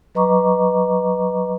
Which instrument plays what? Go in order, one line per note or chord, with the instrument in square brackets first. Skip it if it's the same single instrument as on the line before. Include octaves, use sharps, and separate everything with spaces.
[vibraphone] F#3 B4 D#5 A#5 C#6 D6